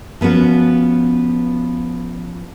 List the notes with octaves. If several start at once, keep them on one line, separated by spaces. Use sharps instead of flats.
F3 B3 C#4 F#4 B4